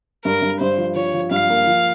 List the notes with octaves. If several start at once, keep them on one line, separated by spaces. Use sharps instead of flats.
G2 A#4
G2
G2 C5
F3
F3 C#5
F3
G2 F5
A#3
F3